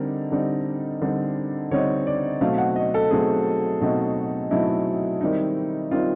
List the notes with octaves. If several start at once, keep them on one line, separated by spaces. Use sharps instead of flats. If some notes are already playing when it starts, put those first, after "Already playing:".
Already playing: D3 G3 C4 D#4 A#4
D3 G3 C4 D#4
D3 G3 C4 D#4
D3 G3 C4 D#4 C#5
D5
B2 F#3 A3 C4 D#4 F5
F#5
D#5
A4
B2 F#3 A3 C4 D#4 G#4
B2 F#3 A3 C4 D#4
B2 F#3 A3 C4 D#4 E4
D#3 G3 C4 D#4
D#3 G3 C4 D#4 F4